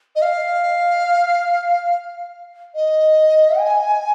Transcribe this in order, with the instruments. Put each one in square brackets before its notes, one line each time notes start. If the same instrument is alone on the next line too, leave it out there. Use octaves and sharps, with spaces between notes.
[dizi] D#5
F5
D#5
G#5